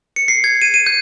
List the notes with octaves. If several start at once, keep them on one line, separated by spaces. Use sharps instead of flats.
C#7
C7
G#6
D#7
D#7
G6